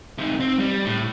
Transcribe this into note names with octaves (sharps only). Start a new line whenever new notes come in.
C3 D#4
C4
G3
A2